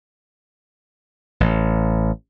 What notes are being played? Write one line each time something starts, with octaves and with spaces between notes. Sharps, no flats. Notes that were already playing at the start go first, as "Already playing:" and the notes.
A1